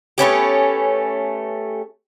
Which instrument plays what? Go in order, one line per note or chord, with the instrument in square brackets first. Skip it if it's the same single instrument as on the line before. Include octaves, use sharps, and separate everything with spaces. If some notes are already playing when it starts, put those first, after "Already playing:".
[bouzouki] A3 B3 C#4 G4